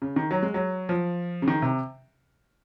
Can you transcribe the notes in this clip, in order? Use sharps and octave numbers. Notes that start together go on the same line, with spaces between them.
C#3
D#3
F#3
G#3
F#3
F3
C#3
D#3
C3